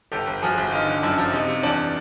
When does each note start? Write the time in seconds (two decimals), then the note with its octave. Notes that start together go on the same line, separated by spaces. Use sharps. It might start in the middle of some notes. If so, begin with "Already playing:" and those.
0.12 G1 G4 A4
0.27 G1
0.43 F3 F#4 G#4
0.57 G1
0.72 D3 D#4 F4
0.87 D3
1.03 F#2 D4 E4
1.18 F3
1.33 C3 D#4
1.48 C3
1.63 E2 D4